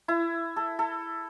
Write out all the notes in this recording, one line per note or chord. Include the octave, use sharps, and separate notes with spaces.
E4
A4
A4